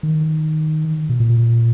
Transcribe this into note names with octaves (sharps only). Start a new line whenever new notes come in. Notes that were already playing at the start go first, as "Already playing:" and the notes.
D#3
B2
A#2